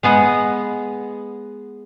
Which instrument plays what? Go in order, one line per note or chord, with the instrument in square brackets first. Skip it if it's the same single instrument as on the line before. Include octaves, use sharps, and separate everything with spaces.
[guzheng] G#3 B3 G#4 F#5